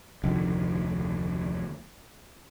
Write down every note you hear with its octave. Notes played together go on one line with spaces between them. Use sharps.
F1 D2 D#3